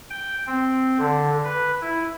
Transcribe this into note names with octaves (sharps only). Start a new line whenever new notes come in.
G5
C4
D3
B4
E4